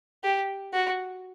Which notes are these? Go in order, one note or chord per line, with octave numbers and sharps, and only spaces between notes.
G4
F#4